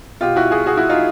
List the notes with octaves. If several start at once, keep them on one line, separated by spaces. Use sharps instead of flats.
B2 F4 G4
E4 F#4
F#4 G#4
F#4 G#4
E4 F#4
D#4 F4